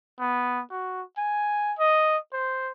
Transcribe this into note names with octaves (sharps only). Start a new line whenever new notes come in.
B3
F#4
G#5
D#5
C5